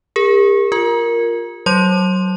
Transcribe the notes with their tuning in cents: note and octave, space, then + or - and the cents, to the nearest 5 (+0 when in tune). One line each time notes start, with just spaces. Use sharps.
G4 +45 A#4 +0
F4 +5 A#4 +0
F#3 +15 C5 +45 C6 +0